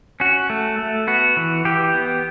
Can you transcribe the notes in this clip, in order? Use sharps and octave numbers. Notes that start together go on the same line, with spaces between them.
C#4 F#4
A3
A3
B3 F#4
E3
E3 G4
B3